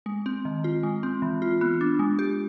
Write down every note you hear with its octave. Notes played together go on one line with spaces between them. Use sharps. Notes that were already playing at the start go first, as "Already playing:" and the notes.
G#3
C4
D#3
F4
G#3
C4
E3
F4
B3
D4
G#3
G4